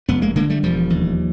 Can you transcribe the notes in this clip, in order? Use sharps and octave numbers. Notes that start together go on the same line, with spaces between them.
F1 A3 B3
G#3 A#3
D3 G#3 A#3
G3 A3
E1 F3 G3
D#2